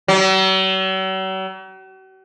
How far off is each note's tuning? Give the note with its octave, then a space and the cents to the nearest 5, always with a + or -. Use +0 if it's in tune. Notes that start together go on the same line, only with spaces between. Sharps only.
F#3 +45